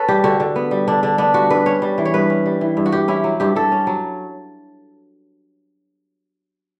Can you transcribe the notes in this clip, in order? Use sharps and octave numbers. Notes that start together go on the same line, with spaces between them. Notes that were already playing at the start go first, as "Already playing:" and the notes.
Already playing: C#4 A4 B4
G3 G4
D3 F#4
D3
B3
G3
D3 D4
D3 D4
B3 D4
G3 F#4
G2 B4
C#4 C#5
G3
E3
C#5
G2 B4
C#4
G3
E3
G2
F#4
G2 G4
C#4 E4
F#3
G2 G4
G2 A4
C#4
F#3